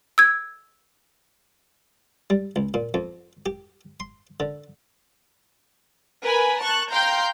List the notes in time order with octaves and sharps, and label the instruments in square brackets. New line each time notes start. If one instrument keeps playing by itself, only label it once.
[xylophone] E6 G#6
[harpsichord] G3
C#2
A#2
F2
G4
C6
D3
[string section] A#4 B4 G#5 B5
A5 C#6 F#6
F5 G5 A#5 C6 G6